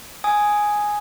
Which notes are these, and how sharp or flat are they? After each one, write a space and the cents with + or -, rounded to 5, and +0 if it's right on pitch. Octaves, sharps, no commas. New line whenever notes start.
G#5 +0 D#6 +0